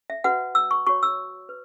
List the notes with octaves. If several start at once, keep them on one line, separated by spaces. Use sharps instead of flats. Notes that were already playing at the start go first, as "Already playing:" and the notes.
E5
F#4 B4 F#5
E6
C#6
F#4 C#5 C#6
E6
B4